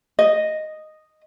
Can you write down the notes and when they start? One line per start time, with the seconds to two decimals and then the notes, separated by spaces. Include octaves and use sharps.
0.19 D#5